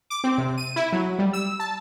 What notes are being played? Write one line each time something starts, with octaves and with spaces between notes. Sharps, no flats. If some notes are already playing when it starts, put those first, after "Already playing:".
D6
C4
C3
D#7
E4
F#3
G3
E6
A5